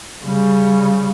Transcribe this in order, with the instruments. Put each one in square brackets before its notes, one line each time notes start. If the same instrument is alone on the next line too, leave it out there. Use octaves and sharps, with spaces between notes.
[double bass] C#3 G3